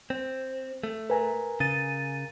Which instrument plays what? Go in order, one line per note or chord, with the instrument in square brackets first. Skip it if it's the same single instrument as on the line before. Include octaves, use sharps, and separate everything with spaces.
[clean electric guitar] C4
A3
[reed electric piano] A#4 G#5 A#5 [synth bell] B4
[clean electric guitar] C#3 [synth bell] A6 D#7